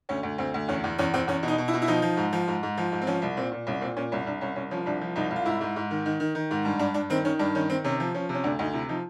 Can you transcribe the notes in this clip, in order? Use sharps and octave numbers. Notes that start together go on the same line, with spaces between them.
D2 C#4
D2
D2 C4
D2
E2 C#4
E2
E2 C#4
E2 C4
E2 C#4
B2
D#4
B2
E4
B2
E4
F3 D#4
F3
G#2
F3
G#2
G#2
F3
G#2
C4
F3 C#4
C2
A#2 C4
A#2
C2 C#4
A#2 C4
A#2 C#4
C2 C#4
C2 D4
C2 C#4
C2 C#4
F3 C#4
C2 D4
F3
C2 D#4
C2
F4
G#2 E4
G#2
G#2
D#3
D#3
D#3
D#3
G#2
G2
G2 D4
G2 D4
D#3 C4
D#3 C#4
G2 D4
D#3 C#4
D#3 C4
C3 C#4
F3
F3 C#4
C3
C#4
D2 D4
D2 D#4
C3 E4
F3 D#4